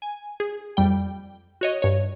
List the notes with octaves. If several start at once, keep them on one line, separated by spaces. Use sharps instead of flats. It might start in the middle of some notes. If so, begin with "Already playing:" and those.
G#5
G#4
F2 G3 G5
F#4 C#5 D#5
G2 C#5